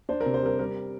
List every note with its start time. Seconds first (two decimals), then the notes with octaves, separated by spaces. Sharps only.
0.09 D4 C5
0.21 A#4
0.26 C3
0.34 C5
0.42 G3 A#4
0.59 G3 A#4